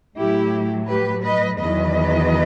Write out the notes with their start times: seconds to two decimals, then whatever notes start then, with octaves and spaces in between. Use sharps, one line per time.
0.17 A2 F#3 E4 G4
0.88 G4 B4
1.24 B4 D#5
1.60 E2 D#3 F#3 B4 D#5